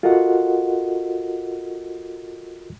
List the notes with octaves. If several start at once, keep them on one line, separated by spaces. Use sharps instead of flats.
F4 F#4 A4 A#4 D#5 F#5